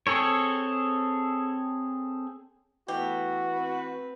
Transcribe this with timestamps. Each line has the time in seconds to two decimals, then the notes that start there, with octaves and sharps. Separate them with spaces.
0.07 C4 G#4 A4 C#5
2.88 E3 A3 B3 F#4 G4
3.50 C4 B4